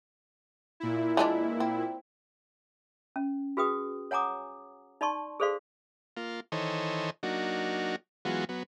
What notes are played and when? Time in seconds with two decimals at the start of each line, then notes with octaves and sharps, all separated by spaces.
0.80 A#2 E4
1.17 E3 G#3 D4
1.60 C4
3.16 C#4
3.57 F#4 G#4 B4 G5 D#6
4.11 C#5 F#5 G#5 A#5 D6 D#6
5.01 D#4 D5 A5 C6 C#6
5.40 G#4 A4 C5 D5 F5 C6
6.17 A#3 F4
6.52 D#3 E3 A4 C5 C#5 D#5
7.23 F#3 A#3 D4 D#4 F#4
8.25 E3 F#3 G#3 B3 F4 F#4
8.49 F#3 B3